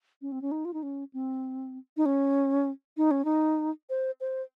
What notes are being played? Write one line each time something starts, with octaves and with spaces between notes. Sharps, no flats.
C#4
C4
C#4
D#4
F4
D#4
C#4
C4
D#4
C#4
D#4
C#4
D#4
C5
C5